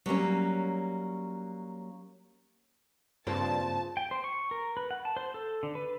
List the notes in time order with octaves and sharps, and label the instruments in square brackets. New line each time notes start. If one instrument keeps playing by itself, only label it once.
[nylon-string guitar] F#3 G3 A#3 C#4
[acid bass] G2 [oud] C#3 A#3 C4 [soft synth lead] F4 [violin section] A5
[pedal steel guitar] G5
C5
C#6
A#4
B4
F#5
A5
C5
A4
D3
B4